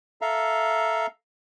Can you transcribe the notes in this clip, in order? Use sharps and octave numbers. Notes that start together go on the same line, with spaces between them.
A4 E5 F5 A#5